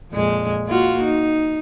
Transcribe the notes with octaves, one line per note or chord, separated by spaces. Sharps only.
F2 A#2 G#3
A#3 F4 F#4
D#4